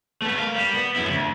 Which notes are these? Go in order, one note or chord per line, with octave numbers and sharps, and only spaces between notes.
A3 B3
A#4 F5
G3
B3
F#2 E4
D2